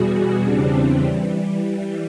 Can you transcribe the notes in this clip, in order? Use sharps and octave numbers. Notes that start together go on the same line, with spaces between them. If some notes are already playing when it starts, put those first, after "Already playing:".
Already playing: E2 B2 G3 F#4 G#4
E2 C#3 E3 G3 C4 D4
E3 G3